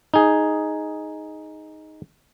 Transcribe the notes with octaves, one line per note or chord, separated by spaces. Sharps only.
D#4 G#4